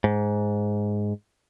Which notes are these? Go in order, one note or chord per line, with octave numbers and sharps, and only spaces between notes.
G#2